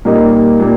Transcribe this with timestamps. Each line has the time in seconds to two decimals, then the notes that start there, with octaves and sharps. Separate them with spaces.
0.05 A#2 G3 A#3 D#4
0.60 A#2 G3 A#3